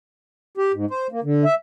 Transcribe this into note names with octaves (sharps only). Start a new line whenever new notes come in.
G4
G#2
C5
A#3
D3
E5